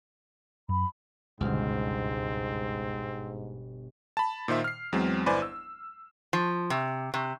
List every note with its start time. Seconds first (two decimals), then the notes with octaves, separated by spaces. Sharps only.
0.69 F#2 B5
1.41 G1 C#2 G#2 B2 C4 F6
4.17 A5 B5
4.48 A#2 D#3 C5 E5
4.64 F6 C7
4.93 E2 F#3 G#3 C4
5.26 G1 E4 B4 C5 D5 G#5
5.42 E6
6.33 F3
6.70 C3
7.14 C3